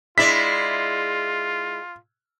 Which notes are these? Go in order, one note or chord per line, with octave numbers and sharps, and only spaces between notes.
G#3 E4 F4 D5 B6